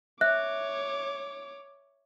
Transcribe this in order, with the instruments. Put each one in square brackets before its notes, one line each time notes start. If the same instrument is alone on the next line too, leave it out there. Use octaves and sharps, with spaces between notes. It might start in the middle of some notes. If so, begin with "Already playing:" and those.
[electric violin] C#5 D6 [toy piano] E5 [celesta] F#6